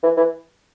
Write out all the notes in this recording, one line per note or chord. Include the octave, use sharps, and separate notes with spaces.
E3
E3